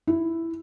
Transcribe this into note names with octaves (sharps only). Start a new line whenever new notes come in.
E4